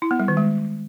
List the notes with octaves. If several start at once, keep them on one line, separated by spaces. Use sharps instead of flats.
E4
B3
G3
D#3
G#3